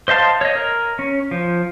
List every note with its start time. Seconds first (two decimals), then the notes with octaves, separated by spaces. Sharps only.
0.08 C5 D#5 F5 A5 C6
0.41 C#5 D#5
0.55 A#4
0.99 C#4
1.31 F3